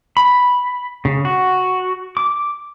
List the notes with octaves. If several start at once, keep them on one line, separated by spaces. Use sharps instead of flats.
B5
C#3
F#4
D6